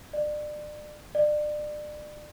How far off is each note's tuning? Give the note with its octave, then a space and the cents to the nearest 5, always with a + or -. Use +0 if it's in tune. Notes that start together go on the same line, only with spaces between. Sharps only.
D5 +30
D5 +30